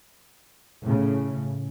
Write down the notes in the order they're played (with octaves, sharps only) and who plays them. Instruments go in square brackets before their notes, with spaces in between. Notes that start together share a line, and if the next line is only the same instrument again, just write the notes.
[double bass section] A2 C#3